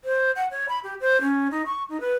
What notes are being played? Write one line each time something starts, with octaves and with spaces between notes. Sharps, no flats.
C5
F#5
C#5
B5
G4
C5
C#4
D#4
C#6
D#4
B4